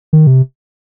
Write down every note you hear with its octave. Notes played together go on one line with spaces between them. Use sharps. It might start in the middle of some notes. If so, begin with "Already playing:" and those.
D#3
C3